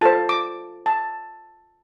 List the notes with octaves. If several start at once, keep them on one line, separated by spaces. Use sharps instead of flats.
F4 A4 C5 A5
D6
A5